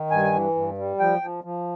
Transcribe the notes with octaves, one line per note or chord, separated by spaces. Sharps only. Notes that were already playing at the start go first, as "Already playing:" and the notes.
Already playing: D#3
G2 G#5
E3
G2
G3
F3 G5
F3
F3